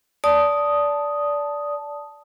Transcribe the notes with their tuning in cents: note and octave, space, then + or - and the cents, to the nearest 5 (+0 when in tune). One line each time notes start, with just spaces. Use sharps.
D5 -15 A5 -5 D#6 +0